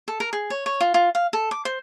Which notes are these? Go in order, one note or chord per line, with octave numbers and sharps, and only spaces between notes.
A4
A#4
G#4
C#5
C#5
F4
F4
F5
A4
D6
C5